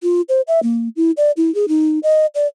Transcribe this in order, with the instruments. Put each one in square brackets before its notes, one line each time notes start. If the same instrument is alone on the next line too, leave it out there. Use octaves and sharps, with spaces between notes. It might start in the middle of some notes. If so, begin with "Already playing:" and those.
[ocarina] F4
C5
E5
A#3
E4
D5
E4
G#4
D#4
D#5
D5